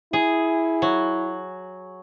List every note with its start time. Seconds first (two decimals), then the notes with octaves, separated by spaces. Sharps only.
0.13 E4 G#4
0.82 F#3